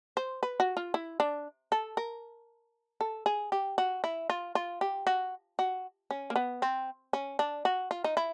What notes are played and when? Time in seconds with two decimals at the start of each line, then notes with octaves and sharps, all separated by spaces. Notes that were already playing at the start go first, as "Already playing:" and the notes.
0.17 C5
0.43 B4
0.60 F#4
0.77 F4
0.94 E4
1.20 D4
1.72 A4
1.97 A#4
3.01 A4
3.26 G#4
3.52 G4
3.78 F#4
4.04 E4
4.30 F4
4.55 F4
4.81 G4
5.07 F#4
5.59 F#4
6.11 C#4
6.30 A#3
6.36 B3
6.62 C4
7.13 C#4
7.39 D4
7.65 F#4
7.91 F4
8.04 D#4
8.17 E4